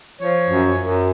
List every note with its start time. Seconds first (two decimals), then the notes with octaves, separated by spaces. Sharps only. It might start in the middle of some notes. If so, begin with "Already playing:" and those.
0.21 F3 C#5
0.50 F#2
0.78 F#2